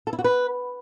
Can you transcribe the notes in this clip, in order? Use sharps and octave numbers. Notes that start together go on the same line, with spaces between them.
A4
E4
F#4
B4